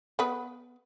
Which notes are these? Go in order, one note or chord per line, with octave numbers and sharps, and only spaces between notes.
B3 B4